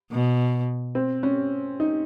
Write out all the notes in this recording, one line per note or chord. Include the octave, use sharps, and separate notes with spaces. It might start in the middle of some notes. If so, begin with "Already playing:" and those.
B2
C4
C#4
D#4